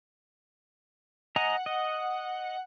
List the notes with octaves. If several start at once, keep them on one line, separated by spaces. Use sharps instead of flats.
D#5 F#5 G#5 A#5
D#5